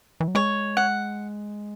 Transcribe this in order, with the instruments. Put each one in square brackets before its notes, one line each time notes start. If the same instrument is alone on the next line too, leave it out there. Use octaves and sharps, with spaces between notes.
[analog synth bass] E3
F#3
[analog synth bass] G#3 [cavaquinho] C#5
[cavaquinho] F#5